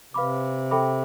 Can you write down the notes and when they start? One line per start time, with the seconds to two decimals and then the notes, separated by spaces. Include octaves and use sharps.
0.14 C3 B4 F5 B5 D6
0.71 A4 E5 G5 B5 D6